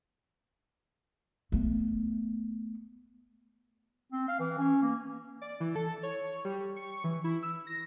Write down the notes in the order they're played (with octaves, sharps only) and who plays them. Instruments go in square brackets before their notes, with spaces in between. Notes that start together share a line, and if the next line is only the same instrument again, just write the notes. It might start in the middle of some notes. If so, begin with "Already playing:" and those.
[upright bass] A3 B3
[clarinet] C4
F5
E3
C#4
A#3
[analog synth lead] D5
E3
A4
C#5
G3
C#6
E3
E4
E6
A#6